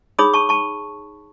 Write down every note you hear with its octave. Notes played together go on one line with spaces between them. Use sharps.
D#4 G#4 C#5 B5 D#6
A5 C#6
A5 C#6